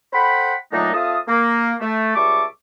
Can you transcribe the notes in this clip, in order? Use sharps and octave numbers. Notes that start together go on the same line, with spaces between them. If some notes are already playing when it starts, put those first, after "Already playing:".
A4 C5 F#5 G5 B5
A#2 D3 F#3 A3 D4 D#4
F2 F3 E5 F5 A5 D#6
A#3
A3
C#2 G3 E5 A5 C#6 D6